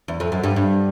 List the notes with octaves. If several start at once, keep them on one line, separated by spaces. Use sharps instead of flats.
E2
F2
F#2
G2
G2